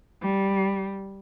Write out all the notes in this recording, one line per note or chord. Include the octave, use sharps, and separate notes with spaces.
G3